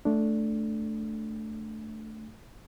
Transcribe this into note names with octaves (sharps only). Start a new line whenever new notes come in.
A3 D4